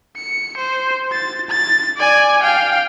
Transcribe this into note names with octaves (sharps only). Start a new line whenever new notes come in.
C#7
C5
A6
A6
D5 G#5
F5 G5